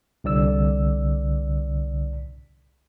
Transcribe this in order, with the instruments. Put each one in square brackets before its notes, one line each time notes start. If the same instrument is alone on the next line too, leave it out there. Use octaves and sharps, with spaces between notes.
[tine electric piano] C2 D3 D5 E6